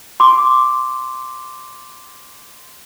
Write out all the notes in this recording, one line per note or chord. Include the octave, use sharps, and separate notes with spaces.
C6 D6